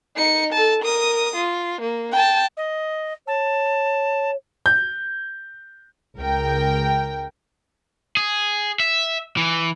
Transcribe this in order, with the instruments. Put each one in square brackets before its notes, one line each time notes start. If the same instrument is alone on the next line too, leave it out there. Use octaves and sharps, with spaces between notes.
[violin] D#4 C#7
A4 A5
A#4 D#6
F4
A#3
G5 A5
[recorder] D#5
[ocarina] C#5 [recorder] A5
[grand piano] G6
[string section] C#2 A#4 G5
[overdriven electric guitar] G#4
E5
E3